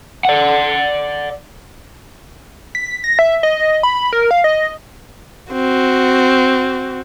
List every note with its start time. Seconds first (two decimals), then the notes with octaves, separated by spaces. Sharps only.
0.25 D5 F#5
2.75 B6
3.04 A#6
3.19 E5
3.43 D#5
3.83 B5
4.13 A#4
4.31 F5
4.44 D#5
5.53 C4 F#4